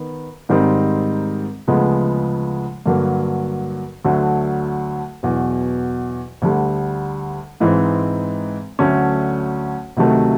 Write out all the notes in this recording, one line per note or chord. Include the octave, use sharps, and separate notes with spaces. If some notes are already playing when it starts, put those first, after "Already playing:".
Already playing: D#3 B3
G#2 D#3 G3 C4 D#4
D2 C#3 F3 G#3 B3
G2 D3 F#3 A#3
D2 D3 F#3 A3
E2 B2 F#3
D2 D3 G3
G#2 E3 G#3 C4 D#4
D2 D3 F#3 A3 C#4
D2 C3 D#3 F#3 A3